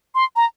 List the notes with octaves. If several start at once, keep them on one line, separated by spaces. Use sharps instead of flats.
C6
A#5